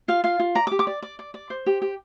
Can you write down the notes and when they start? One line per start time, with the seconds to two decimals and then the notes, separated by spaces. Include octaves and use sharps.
0.08 F4 F5
0.24 F4 F5
0.39 F4
0.55 D5 A#5
0.67 D6
0.71 G4
0.79 D6
0.87 D5
1.02 D5
1.19 D5
1.34 D5
1.50 C5
1.66 G4
1.82 G4